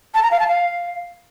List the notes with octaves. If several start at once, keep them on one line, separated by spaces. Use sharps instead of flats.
A5
A#5
F5
A5
F5